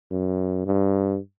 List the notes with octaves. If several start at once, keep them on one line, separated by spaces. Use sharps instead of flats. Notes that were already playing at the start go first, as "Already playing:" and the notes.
F#2
G2